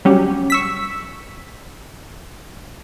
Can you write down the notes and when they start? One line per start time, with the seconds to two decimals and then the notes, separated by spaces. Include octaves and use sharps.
0.05 F#3 G3 C#4 G4
0.50 C#6 E6 B6